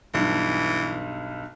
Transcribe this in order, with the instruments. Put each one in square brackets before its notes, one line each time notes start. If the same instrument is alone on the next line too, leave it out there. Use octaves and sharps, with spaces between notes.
[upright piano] B1 G2 [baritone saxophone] E3